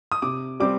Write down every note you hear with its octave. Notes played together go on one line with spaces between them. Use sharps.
D#6
C3 D6
G3 C4 D6